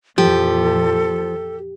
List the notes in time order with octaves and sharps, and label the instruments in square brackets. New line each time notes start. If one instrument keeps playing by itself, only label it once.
[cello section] F2 A#2 E3 [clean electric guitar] F3 [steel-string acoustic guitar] G4 [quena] A4